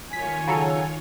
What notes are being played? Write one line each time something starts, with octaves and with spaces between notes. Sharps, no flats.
D#3 F4 C#5 G#5 B6
C#3 F#3 A4